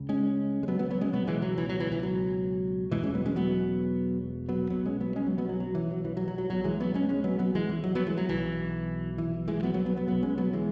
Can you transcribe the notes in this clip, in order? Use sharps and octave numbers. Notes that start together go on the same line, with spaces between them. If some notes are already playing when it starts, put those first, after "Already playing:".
Already playing: C#2 C#3
G#3 C#4
G#3
F#3 B3
F#3 B3
F#3 B3
G#3 C#4
C#2 B2 F#3 B3
E3 G#3
F#3
E3
F#3
E3
E3
F#3
E1 E2 B2 E3 G#3
G#3 C#4
F#3 B3
G#3 C#4
F#3 B3
F#3 B3
B1 B2 F#3 B3
G#3 C#4
F#3 B3
G#3 C#4
F#3
F#3 B3
F#3
F#3
E3
F#3
E3
F#3
F#3
F#3
B1 B2 F#3
E3 G#3
F#3 B3
G#3 C#4
G#3 C#4
F#3 B3
F#3 B3
E3 G#3
E3
F#3
F#3 B3
E3 G#3
F#3
B1 B2 E3
E3
E3 G#3
F#3 B3
F#3 B3
F#3 B3
F#3 B3
B1 B2 F#3 B3
G#3 C#4
F#3 B3
E3 G#3